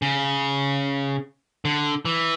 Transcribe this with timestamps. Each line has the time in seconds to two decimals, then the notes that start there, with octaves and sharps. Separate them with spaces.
0.02 C#3
1.65 D3
2.05 E3